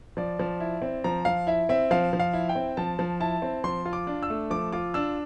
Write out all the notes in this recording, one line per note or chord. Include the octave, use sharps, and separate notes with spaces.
F3 D5
F3
E4
C4
F3 A#5
F3 F5
E4 E5
C4 E5
F3 F5
F3
F5
E4
G5
C4
F3 A5
F3
E4 A5
C4
F3 C6
F4
D6
D4
E6
A3
F3 D6
F4 D6
D4 E6